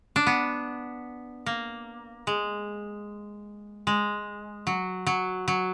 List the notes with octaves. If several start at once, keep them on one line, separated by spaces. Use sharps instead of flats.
D4
B3
A#3
G#3
G#3
F#3
F#3
F#3